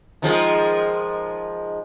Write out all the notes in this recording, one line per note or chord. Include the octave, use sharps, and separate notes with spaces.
D#3 F3 G#3